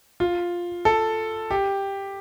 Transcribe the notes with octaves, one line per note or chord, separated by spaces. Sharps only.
F4
A4
G4